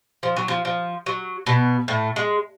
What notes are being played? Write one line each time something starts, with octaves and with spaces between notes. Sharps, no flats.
F3
F#3
F3
F3
F#3
B2 B3
A2 A3
G#3